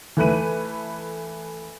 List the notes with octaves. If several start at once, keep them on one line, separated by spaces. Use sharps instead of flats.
E3 A3 B4 D#7